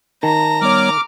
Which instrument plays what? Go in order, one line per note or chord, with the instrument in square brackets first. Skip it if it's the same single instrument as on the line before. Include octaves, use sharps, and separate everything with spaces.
[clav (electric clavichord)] D#3 [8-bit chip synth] A5 [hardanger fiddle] A#5
[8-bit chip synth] G3 B3 C#5 [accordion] D6 F6